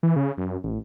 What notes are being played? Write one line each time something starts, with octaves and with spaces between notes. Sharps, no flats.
E3
C#3
F#2
A1